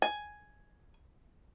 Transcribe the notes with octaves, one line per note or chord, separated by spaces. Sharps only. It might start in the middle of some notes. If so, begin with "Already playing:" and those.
G#5